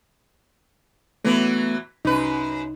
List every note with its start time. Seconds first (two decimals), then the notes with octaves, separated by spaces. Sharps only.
1.25 E3 F#3 A3 B3
2.05 C2 F#2 D#4 B4